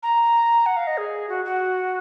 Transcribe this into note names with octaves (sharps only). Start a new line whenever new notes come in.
A#5
F#5
F5
D#5
G#4
F#4
F#4